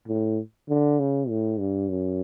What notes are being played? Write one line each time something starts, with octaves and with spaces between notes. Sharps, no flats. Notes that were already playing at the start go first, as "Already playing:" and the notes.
A2
D3
C#3
A2
G2
F#2